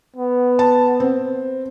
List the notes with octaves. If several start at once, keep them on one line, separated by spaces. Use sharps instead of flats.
B3
A5
C4